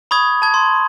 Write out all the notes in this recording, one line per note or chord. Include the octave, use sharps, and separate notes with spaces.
B5 C#6 D#6 G#6
A5 G#6
C6